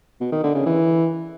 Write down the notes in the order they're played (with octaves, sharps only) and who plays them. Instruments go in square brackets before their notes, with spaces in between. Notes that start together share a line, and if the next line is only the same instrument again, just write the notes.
[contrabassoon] B2
D#3
D3
C#3
E3